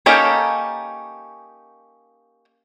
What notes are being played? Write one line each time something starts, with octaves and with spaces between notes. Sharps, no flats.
A#3 C#4 D#4 G4 A4